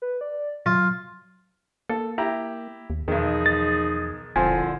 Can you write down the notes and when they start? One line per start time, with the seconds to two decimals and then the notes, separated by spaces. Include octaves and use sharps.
0.02 B4
0.21 D5
0.66 F#3 F4
1.89 A#3 A4
2.18 E4 G4 A#5
2.90 D#2
3.08 B1 E2 D#3 F3 D#4 G#4
3.46 A6
4.36 E1 C2 A#2 D3 F3 C4 G#5